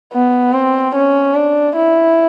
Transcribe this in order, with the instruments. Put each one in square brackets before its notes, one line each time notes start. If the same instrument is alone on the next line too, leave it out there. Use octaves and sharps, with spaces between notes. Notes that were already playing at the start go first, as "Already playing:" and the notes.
[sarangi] B3
C4
C#4
D4
E4